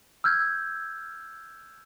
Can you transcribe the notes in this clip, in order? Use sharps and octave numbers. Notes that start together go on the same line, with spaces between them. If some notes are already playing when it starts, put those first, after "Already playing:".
E6 F6 G6 G#6